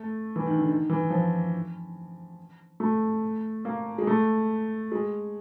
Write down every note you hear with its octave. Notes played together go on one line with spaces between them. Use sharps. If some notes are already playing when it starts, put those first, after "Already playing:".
Already playing: A3
E3
D#3
D3
D#3
E3
F3
A3
A#3
G#3
A3
G#3